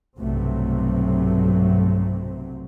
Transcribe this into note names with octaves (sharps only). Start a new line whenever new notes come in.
B1 G2 C3 F#3 A3 C4